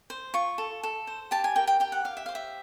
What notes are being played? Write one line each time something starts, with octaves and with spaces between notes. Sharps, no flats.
C5
F4 C#6
A4
A4
C5
G4 A5
G#5
A#4 G5
G5
G4 G5
F#5
G4 F5
E5
C5 F5
E5